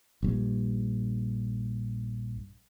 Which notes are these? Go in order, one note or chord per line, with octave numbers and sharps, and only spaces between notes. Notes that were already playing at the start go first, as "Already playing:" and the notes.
A#1 G2